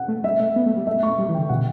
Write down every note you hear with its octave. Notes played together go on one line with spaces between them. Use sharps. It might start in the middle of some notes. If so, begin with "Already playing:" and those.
Already playing: F#5
A3
G3 E5
A3
B3
A3
G3
A3 E5
A3 C#6
G3
E3
D3 G5
B2 F#5